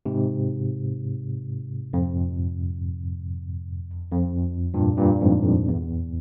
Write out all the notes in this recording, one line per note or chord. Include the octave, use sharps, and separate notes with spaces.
G#2 C3
F2
F2
G2 A#2
G2 A#2
F2 G#2
F2
E2